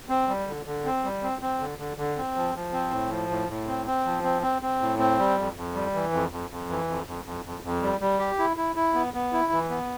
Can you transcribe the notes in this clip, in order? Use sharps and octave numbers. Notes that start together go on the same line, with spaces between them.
C4
G3
D3
D3
C4
G3
C4
C4
D3
D3
D3
C4
F3
F3
C4
A2
F3
A2
A2
C4
C4
F3
C4
C4
C4
A2
C4
G3
F2
F2
G3
E3
F2
F2
F2
E3
F2
F2
F2
F2
F2
G3
G3
G4
E4
E4
E4
B3
B3
E4
E3
B3